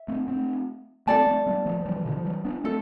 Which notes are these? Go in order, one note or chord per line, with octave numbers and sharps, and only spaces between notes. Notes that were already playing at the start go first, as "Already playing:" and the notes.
Already playing: E5
A3 C4
A3 C4
A3 C4 A4 D5 A5
A3 C4
G3 B3
F3 A3
F3
E3 G3
E3
B2 D3
F3
E3 G3
B3 D4
A3 C4 A4